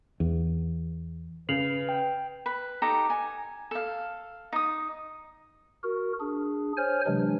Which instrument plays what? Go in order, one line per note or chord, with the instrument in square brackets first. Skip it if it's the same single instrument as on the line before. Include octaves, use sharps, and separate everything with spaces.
[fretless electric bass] E2
[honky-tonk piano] C#3 [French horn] B4 [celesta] C7 F7 F#7
[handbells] G5
[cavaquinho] B4
D#4 G4 A4 A#5
G#5
A4 F5
D#4 D#6
[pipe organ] F#4 A#4
D4 G#4
C5 C#5 G#5 F6
C3 E3 F#3 G#3 D4